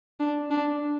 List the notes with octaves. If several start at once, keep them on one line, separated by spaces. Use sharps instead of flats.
D4
D4